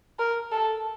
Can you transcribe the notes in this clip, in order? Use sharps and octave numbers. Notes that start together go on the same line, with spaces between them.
A#4
A4